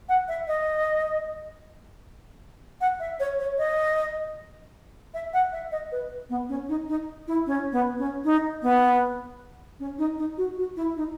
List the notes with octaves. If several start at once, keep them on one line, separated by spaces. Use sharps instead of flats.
F#5
E5
D#5
F#5
E5
C#5
C#5
D#5
E5
F#5
E5
D#5
B4
B3
C#4
D#4
D#4
E4
C#4
B3
C#4
D#4
B3
C#4
D#4
D#4
F#4
F#4
E4
D#4